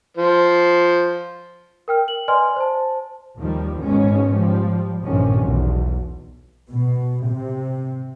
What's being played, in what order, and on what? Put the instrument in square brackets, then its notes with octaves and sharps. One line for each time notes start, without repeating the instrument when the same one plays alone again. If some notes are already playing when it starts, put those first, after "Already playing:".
[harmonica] F3 C5
[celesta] A#4 G5 F6
F#7
B4 D5 D#5 G#5 C6 F6
C5 A5
[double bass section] D#2 D#3 F3 G3
G#1 G#2 B2 G#3 C#4
F3 G3
A#1 G2 C3 D#3 F3 C#4
B1 E2
B2
C3